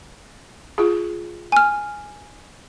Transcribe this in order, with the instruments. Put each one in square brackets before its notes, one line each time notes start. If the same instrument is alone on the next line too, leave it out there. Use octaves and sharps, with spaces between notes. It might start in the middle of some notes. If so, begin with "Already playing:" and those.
[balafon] F4 G#4
[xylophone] G#5 F6